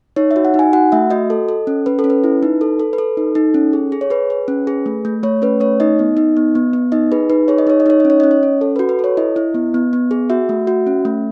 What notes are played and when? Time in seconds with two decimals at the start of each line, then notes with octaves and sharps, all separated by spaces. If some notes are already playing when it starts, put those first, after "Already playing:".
0.16 D#4 C#5
0.31 E5
0.36 F#4
0.45 F#5
0.54 D#4
0.59 G#5
0.73 F#4 F#5
0.92 A3 E5
1.10 F#4 D#5
1.30 A4
1.49 A4
1.67 C#4
1.86 C#4 B4
1.99 A4
2.04 C#4
2.10 B4
2.24 E4
2.43 D#4
2.61 A4
2.80 A4
2.93 B4
2.98 A4
3.17 D#4
3.35 D#4
3.54 C#4
3.73 G#4
3.92 G#4
4.01 C#5
4.10 G#4 B4
4.30 G#4
4.48 C#4
4.67 G#4
4.86 A3
5.05 A3
5.23 A3 C#5
5.42 C#4 B4
5.60 A3 C#5
5.80 D#4 D#5
5.99 B3
6.17 D#4
6.37 B3
6.55 B3
6.73 B3
6.92 D#4 D#5
7.12 G#4 B4
7.30 D#4 B4
7.48 G#4 C#5
7.58 D#5
7.67 D#4 C#5
7.80 D#5
7.86 D#4 C#5
8.00 C#4 D#5
8.10 C#5
8.20 C#4 D#5
8.31 C#5
8.43 C#4
8.61 A4
8.76 F#4 B4
8.89 B4
8.99 A4 C#5
9.17 E4 D#5
9.36 E4
9.55 B3
9.74 B3
9.93 B3
10.11 G#4
10.30 F#4 E5
10.49 A3
10.67 F#4
10.87 C#4
11.05 A3